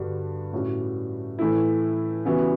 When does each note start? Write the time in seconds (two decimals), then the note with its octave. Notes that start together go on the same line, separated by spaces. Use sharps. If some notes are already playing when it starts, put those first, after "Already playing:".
Already playing: G2 D3 G3 D4 F#4
0.53 A2 G3 C#4 F#4
1.38 A2 E3 A3 E4
2.25 C#3 E3 G3 B3 F#4